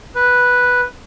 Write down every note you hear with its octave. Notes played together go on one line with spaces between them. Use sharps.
B4